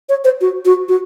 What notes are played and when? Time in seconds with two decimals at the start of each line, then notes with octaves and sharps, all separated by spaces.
0.09 C#5
0.24 C5
0.41 F#4
0.65 F#4
0.89 F#4